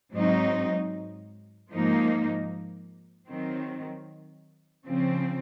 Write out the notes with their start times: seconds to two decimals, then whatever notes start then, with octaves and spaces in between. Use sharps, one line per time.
0.13 G#2 F#3 C4 D#4
1.71 G#2 F3 A#3 D#4
3.28 D#3 F#3 C4
4.86 C#3 F3 C4